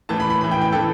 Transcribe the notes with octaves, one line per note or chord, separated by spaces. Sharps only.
A2 E3 A5
B5
B5
A2 E3 B5
G5
G5
A4
E3